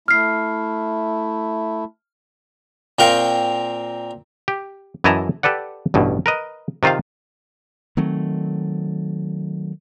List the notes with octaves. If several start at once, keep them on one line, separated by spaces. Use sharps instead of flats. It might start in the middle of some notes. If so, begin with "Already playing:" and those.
A3 E4 F6 C7
A#2 C4 A#4 F5 G5 C#6
G4
F#2 E3 E4 D#5 A5 A#5
G4 A4 B4 D5 F#5
A1 G2 B2
A#4 B4 D#5
C3 D#3 F4 C5 F5
D#3 F#3 A3 C4